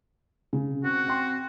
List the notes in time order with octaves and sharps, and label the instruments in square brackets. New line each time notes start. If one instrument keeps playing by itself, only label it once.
[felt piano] C#3
[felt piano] C4 [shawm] F#4
[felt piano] C4 G5 C6